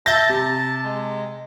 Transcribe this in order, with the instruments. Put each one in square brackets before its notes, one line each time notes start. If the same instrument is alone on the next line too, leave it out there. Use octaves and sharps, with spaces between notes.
[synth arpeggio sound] E5 G6 A6 [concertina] A5 [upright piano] A#6
[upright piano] C3
[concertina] G#3